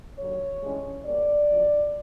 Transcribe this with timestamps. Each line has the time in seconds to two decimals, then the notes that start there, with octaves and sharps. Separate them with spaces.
0.18 D#2 D3 F#3 C#5
0.61 G2 E3 G#3 C#4
1.05 B2 G3 A#3 D5
1.48 F#2 D3 F3